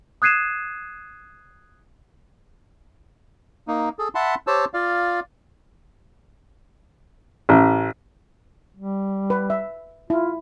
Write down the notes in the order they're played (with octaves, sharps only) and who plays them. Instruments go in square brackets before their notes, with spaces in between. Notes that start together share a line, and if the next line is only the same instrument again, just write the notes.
[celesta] D#6 F#6 G#6 C7 D#7 E7
[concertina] A#3 D#4
G#4 A4
E5 F#5 A5 B5 C6
G4 C5 C#5 A5 E6
F4 D5 F5
[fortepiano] A1
[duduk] G3
[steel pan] B4
E5
[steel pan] E4 [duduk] F4